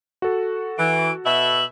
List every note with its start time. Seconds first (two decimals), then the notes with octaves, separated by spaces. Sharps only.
0.22 F#4 A4
0.78 E3 D7
1.26 B2 E5 F#7